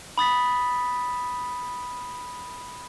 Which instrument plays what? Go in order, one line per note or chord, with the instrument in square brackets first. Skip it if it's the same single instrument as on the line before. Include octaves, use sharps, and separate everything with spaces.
[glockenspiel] B5 D#6 A6 B6